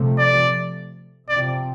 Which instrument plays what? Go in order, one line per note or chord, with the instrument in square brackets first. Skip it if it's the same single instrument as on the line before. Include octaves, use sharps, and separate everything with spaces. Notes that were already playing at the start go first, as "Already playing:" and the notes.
Already playing: [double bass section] C3 F3 A3
[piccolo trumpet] D5
[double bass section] C3 F3 C4 [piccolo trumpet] D5